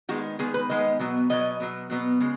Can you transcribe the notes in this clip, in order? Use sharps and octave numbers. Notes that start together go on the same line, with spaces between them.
D#3 G#3 B3 F#4
D#3 G#3 B3 G#4
B4
D#3 G#3 B3 D#5
B2 F#3 B3
B2 F#3 B3 D#5
B2 F#3 B3
B2 F#3 B3
C#3 G#3